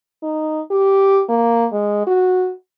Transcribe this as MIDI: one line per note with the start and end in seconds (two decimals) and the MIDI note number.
0.23 0.61 63
0.71 1.22 67
1.29 1.66 58
1.72 2.03 56
2.07 2.52 66